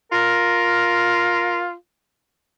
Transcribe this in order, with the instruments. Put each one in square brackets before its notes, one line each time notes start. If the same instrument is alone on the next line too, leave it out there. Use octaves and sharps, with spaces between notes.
[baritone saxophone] F4 [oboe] A#4